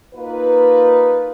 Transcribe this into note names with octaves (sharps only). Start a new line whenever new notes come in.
A#3 D#4 F4 B4